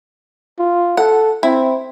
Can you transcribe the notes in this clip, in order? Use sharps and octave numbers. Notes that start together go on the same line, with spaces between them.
F4
A4 F#5
C4 E4